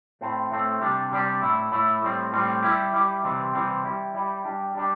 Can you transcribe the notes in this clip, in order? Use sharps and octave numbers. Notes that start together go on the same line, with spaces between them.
A2 A3 C4
A2 A3 C4
C3 G3 D4 G4
C3 G3 D4 G4
A2 A3 E4
A2 A3 E4
A2 G3 C4
A2 G3 C4
G3 E4 G4
G3 E4 G4
C3 E3 G3 C4
C3 E3 G3 C4
G3 E4 G4
G3 E4 G4
G3 D4 G4
G3 D4 G4